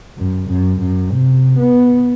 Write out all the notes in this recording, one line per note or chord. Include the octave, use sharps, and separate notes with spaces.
F#2
F#2
F#2
C3
B3